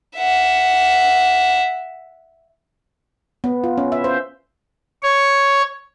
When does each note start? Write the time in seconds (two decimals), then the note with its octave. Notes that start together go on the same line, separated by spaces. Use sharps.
0.18 E5 F#5
3.44 B3
3.64 F4
3.78 C#4
3.92 E5
4.04 C5
5.03 C#5